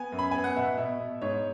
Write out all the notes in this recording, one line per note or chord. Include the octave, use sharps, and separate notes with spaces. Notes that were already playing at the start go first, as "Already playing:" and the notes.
Already playing: B3 G#5
F#2
B5
B3 G#5
F#5
B2 E5
B2 E5
B2
G#2 C#5